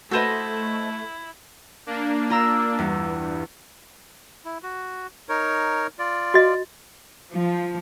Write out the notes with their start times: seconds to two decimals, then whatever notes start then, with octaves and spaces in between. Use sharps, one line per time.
0.11 A3 E4 F#4 A4 B4 C5 D#5
1.86 A#3 D4
2.30 F4 A#5 E6
2.79 E2 G2
4.45 E4
4.63 F#4
5.29 D#4 A#4 C#5
5.99 F4 D5
6.34 F#4 D#5
7.31 F3